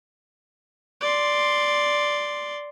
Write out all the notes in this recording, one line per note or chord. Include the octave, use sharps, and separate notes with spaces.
D5 C6